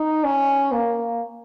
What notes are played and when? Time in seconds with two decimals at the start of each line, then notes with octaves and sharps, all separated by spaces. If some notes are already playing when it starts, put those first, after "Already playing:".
Already playing: D#4
0.24 C#4
0.72 A#3